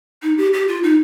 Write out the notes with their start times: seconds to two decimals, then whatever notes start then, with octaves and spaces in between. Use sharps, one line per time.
0.23 D#4
0.38 G4
0.53 G4
0.68 F4
0.83 D#4